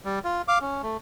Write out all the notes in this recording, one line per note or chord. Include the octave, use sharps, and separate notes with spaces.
G3
F4
F5 D6
C#4
A3